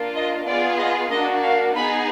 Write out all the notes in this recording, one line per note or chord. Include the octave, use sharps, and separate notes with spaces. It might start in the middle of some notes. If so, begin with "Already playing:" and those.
Already playing: A#3 D4 F4
D#5
B3 F4 G#4 D5
D#5
A#3 D4 F#4 D#5
F5
B3 D#4 G#4 B5